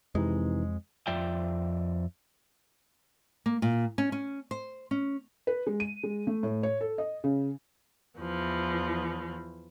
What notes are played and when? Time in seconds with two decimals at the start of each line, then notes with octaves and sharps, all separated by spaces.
0.15 F2 C3 E3 G#3 D#4
1.07 F2 F4 D5 E5 G5
3.46 A#3
3.62 A#2
3.98 C#4
4.12 C#4
4.51 C5
4.91 C#4
5.47 B4
5.67 G#3
5.80 D#7
6.03 G#3
6.27 A3
6.43 A2
6.63 C#5
6.81 A4
6.98 D#5
7.24 C#3
8.18 E2 E3 F3